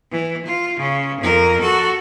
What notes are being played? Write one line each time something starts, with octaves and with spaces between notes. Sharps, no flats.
E3
F4
C#3
F2 A#4
F#4 A4